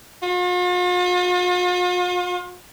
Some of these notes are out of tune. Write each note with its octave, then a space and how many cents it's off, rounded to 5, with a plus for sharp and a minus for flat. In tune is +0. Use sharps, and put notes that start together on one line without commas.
F4 +45